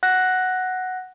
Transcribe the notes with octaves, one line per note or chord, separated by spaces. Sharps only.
F#5 F#6 A#6